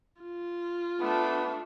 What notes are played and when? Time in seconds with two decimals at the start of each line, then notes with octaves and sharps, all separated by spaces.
0.22 F4
1.00 A3 B3 D4